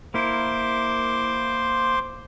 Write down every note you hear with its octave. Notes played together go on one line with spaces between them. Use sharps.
A#3 E4 A#4 C5 C6 D6